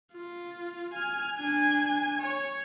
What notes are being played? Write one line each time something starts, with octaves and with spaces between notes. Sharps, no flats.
F4
G#5 F6
D4 G#5
C#5